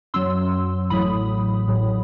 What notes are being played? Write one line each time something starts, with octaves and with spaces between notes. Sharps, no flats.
F#2 F#3 C6 E6
A1 A2 F#3 B5 D#6
A1 A2 F#3